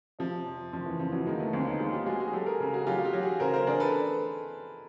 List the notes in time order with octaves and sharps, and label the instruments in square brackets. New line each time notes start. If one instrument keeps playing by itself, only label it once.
[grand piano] C3 [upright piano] F3
[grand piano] F2
[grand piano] F#1 [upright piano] F3
[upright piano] E3
[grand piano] F#1 [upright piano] F3
[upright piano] E3 F#3
[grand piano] D#3 [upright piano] G#3 A#3
[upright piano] A3 B3
[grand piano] D2 [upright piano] A#3 C4
[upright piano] C#4 D#4
[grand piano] G#3 [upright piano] D#4 F4
[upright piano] F4 G4
[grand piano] G#3 [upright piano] F#4 G#4
[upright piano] F#4 G#4
[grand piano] F#3 [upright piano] G4 A4
[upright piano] G#4 A#4
[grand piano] C#3
[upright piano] F#4 G#4
[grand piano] F#3 [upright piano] F4 G4
[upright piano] F#4
F4 G4
[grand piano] F#3
[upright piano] F#4 G#4
[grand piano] C#3 [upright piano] A#4 C5
[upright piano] A#4 C5
[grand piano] D4 [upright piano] G#4 A#4
[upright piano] A4 B4